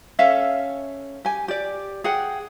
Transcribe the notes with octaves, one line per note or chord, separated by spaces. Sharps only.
C#4 A4 E5 F5
G4 G#5
G4 D5
G#4 F#5 G5